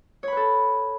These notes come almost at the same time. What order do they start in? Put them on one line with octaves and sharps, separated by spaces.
C#5 B5 B4 A4